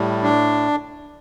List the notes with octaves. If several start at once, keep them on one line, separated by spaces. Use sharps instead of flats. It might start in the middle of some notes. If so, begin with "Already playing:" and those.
Already playing: A2 G3
D4